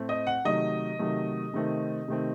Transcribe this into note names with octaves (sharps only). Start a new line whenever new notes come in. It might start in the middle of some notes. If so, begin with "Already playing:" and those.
Already playing: A2 A3 C4
D#5
F#5
C3 D#3 F#3 A3 D#5
C3 D#3 F#3 A3
C3 D#3 A3 C4
C3 D#3 A3 C4